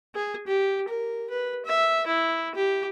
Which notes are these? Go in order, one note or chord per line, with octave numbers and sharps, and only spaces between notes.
G#4
G4
A#4
B4
E5
E4
G4